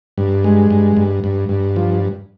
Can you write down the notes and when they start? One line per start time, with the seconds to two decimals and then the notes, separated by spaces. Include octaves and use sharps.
0.18 G2
0.44 G#3
0.70 G2
0.97 G2
1.24 G2
1.49 G2
1.76 F3